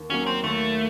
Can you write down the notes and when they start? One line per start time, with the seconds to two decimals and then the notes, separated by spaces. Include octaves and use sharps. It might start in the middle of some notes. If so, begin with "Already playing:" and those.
Already playing: D#2
0.10 D#3 F#3 A#3 C#4
0.26 C4
0.44 D#2 A3